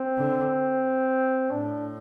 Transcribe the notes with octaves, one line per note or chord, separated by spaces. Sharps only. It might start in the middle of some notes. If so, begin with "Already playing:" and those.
Already playing: C4
D3
A2 D4